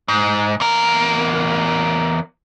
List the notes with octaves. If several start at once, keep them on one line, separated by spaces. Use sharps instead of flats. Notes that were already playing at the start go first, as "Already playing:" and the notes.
G#2
E2 A#4